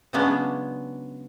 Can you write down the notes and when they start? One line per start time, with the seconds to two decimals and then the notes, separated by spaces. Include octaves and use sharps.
0.13 C#3 F#3 G#3 B3 C#4 D4